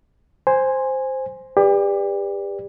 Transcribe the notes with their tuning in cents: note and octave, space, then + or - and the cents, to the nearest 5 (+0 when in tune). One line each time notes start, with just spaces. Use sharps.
C5 +0 G#5 -10
G4 +35 B4 +0 D5 +0